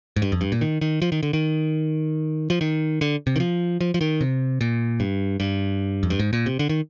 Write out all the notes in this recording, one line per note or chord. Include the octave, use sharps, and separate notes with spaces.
G#2
G2
F2
G2
A#2
D#3
D#3
F3
D#3
D3
D#3
F3
D#3
D3
C3
D#3
F3
F3
F3
D#3
C3
A#2
G2
G2
F2
G2
G#2
A#2
C3
D3
D#3